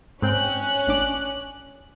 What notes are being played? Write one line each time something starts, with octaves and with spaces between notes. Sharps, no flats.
G#2 C4 C#4 G5 F#6
A1 D4 D6